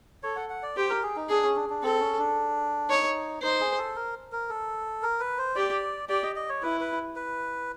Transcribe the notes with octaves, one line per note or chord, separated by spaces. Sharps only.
A4 C#5
F#5
F#5
D5
G4 C5
A#4
G#4
D#4
D4 G#4
C#4
D4
D4
C4 A4
C#4
D4
D#4 C#5
D#4 C5
G#4
A4
A#4
A#4
A4
A#4
B4
C5
G4 D5
G4 D5
D#5
D#5
C#5
E4 B4
B4
B4